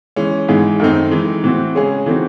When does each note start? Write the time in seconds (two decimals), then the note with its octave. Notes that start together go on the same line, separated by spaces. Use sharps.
0.16 E3 G#3 C#4
0.49 G#2 E3 G#3 D#4 G#4
0.80 F#2 D#3 A3 C4 D#4
1.11 E3 G#3 D#4
1.43 A2 E3 C4 F#4
1.75 C#3 G#3 C#4 G#4
2.06 E3 A3 C4 D#4 F#4